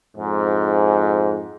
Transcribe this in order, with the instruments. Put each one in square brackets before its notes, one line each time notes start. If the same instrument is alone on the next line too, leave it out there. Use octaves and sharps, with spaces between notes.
[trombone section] F2 G#2